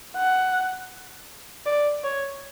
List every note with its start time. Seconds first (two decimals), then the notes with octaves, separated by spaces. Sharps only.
0.17 F#5
1.66 D5
2.04 C#5